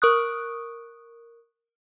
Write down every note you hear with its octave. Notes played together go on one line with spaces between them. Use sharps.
A#4 C#6 D#6 F#6